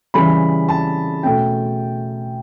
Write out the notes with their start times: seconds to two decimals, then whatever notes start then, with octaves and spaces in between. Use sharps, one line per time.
0.14 C#3 E3 G3 B5
0.69 A5
1.23 B2 A3 C#4 G5